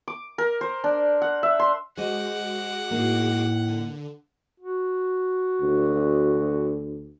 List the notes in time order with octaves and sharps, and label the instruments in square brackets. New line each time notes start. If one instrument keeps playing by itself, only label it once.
[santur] D6
A#4
C5
D4
F#5
E5
C6
[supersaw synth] G#3 F#4 D6 [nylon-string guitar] G#4 C5 D#5 [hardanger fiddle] F#5
[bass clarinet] A2 [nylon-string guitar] A#3 D#4
[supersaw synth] D3
[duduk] F#4
[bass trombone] D2